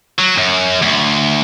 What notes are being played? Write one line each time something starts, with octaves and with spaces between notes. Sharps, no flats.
F#3
F#2
D2